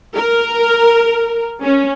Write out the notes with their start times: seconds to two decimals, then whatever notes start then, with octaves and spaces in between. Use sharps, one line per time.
0.15 A#4
1.63 C#4